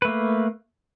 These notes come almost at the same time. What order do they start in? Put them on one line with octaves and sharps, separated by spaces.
B4 A3 A#3